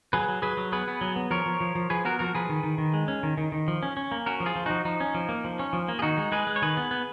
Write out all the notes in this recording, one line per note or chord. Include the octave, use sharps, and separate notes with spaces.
F#3 G#4 B4
F#3
F#3 G#4 B4
F#3
B3 G#4 B4
B3
F#3
B3
F3 A#4 C#5
F3
F3
F3
F3 G#4 B4
B3 F#4 A#4
F3 F#4 A#4
F3 G#4 B4
D#3
D#3
D#3
G#3
C#4
D#3
D#3
D#3
F3
C#4
C#4
A#3
C#4 F#4 A#4
F3
F4 G#4
F3
F3 D#4 F#4
F3 D#4
C#4
F3
A#3
F3
C#4
F3
A#3
G#4
D#3 D#4 F#4
G#3
G#3 G#4 B4
G#3
C#5
D#3 G#4 B4
B3
B3